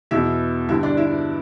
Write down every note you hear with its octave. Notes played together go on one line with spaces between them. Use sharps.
E2 B2 E4 E5
G2 D3 E4 E5
D4 D5
E4 E5